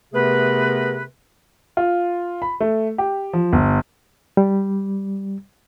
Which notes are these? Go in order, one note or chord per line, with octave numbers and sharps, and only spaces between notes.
C3 A3 B3 G#4 A#4 B4
F4
B5
A3
G4
F3
G1
G3